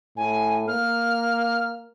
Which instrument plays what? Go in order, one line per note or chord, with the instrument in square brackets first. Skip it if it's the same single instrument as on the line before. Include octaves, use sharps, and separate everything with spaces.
[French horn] A2 [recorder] G#5
[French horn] A#3 [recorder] F6